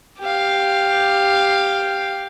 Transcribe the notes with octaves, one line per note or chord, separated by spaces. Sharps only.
G4 F5